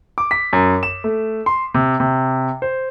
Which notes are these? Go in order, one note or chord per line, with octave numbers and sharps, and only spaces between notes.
D6
B6
F#2
E7
A3
C6
C3
C3
C5